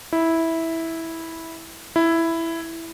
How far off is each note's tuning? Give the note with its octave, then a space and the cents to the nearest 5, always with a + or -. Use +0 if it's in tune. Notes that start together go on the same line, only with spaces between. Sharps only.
E4 -10
E4 +5